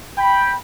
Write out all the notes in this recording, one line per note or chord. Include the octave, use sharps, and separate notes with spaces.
G5 B5